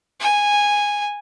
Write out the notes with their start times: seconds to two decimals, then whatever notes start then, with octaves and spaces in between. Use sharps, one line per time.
0.21 G#5